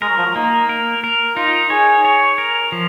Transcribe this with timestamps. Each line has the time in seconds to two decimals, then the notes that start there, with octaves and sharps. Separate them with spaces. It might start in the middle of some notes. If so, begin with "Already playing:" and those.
0.02 G#3 A#4
0.09 F#3
0.18 F3
0.26 F#3
0.36 A#3 D#4
0.69 A#4
1.04 A#4
1.37 D#4 F4
1.70 G#4 C#5
2.05 C#5
2.38 A#4
2.72 F3